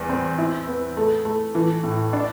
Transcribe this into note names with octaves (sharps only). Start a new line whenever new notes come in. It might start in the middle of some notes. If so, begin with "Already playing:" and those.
Already playing: E2 G3
C4
E4
B3
A3
A3
E3
A2
D4